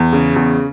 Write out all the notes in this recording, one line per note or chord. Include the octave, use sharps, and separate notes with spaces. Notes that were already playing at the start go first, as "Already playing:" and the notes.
Already playing: E2
C#3
E2